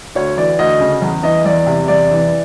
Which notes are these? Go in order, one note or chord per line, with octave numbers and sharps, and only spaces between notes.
D2 C#5
E3 D5
D2 D#5
C#3
E2
E3 D#5
E2 D5
C3
E2 D5
E3